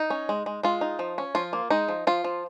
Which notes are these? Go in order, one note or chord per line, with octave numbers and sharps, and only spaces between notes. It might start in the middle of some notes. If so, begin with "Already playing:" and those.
Already playing: D#4
C#4
G#3
G#3
G#3 F4
D#4
F3
C#4
F3 F4
A#3
G#3 D#4
F3
F3 F4
F3